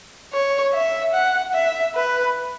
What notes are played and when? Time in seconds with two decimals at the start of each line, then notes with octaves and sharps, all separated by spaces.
0.33 C#5
0.74 E5
1.13 F#5
1.54 E5
1.95 B4